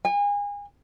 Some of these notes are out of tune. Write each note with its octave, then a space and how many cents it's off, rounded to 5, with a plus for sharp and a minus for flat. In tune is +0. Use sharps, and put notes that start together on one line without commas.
G#5 -35